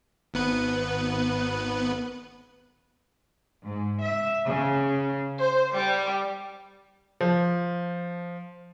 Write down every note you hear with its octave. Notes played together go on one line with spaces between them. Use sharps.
G#1 B3 B4
G#2
E5
C#3
C5
G3
F3